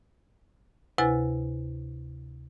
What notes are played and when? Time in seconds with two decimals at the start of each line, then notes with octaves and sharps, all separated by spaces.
0.98 D2 C3 E4 B4 G#5 A6